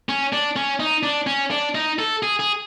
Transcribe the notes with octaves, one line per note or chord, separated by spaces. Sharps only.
C#4
D4
C#4
D#4
D4
C#4
D4
D#4
A4
G#4
G#4